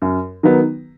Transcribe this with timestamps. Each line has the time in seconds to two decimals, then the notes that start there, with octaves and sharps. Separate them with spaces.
0.02 F#2
0.43 D#3 F#3 B3